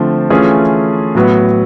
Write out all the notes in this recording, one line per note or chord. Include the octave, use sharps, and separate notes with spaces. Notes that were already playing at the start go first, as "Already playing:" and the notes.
Already playing: D3 F3 A3 C4
E3 A3 C#4 F4 G#4
A2 F#3 B3